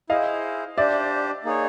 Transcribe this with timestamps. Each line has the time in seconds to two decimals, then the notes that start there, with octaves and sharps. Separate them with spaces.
0.10 E4 G#4 C5 D#5 F5
0.77 D4 G4 C5 D5 E5
1.45 A#3 D#4 G#4 C#5